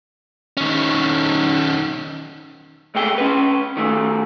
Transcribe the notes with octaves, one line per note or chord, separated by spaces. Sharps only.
D#3 C#4
B1 G#2 A3 G#4 G5
C#4 B4
D#3 A3